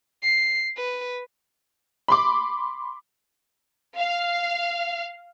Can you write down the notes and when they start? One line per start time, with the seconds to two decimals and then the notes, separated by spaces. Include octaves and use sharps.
0.22 C7
0.77 B4
2.08 B5 C6 D6
3.98 F5